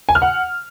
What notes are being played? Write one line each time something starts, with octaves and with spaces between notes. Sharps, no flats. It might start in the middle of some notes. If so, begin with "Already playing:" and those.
G#5
F6
F#5